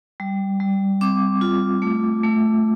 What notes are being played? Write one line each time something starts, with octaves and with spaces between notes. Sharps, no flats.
G3
G3
C4 D6
F4
A3
A3